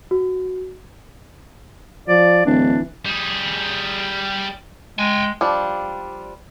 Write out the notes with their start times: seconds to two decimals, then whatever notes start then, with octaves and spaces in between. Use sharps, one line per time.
0.11 F#4
2.08 F3 D5
2.46 D1 E3 D4
3.05 G3 G#4
4.99 G#3 G5 G#5
5.41 F3 G3 D4